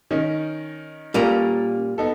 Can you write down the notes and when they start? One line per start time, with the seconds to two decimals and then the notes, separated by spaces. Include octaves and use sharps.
0.11 D#3 C#4 D#4
1.14 A#2 G3 C#4 F4 A4 A#4 D#7 F7
1.98 B3 D#4 A4